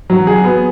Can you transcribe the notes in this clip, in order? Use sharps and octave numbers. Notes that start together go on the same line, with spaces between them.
F#3
G#4
B3